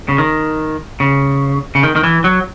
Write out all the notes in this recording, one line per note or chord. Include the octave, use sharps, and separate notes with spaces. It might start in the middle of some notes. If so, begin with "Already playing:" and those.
C#3
D#3
C#3
C#3
D#3
D#3
E3
F#3